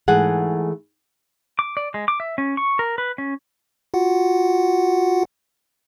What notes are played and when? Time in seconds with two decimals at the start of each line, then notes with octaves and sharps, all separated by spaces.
0.08 G#2 E3 A3 G#4 F#5
1.59 D6
1.77 D5
1.94 G#3
2.08 D6
2.20 E5
2.38 C#4
2.57 C#6
2.79 A#4
2.98 B4
3.18 C#4
3.94 F4 F#4 F#5